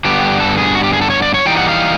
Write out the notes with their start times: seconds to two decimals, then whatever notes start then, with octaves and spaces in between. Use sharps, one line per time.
0.05 G2 D3 G3 B3 G4
0.40 A4
0.58 G#4
0.75 F#4
0.84 G4
0.93 G#4
1.01 A4
1.10 C#5
1.22 D5
1.34 C#5
1.46 E3 G3 A#3 D#4 G5
1.57 F#5
1.69 F5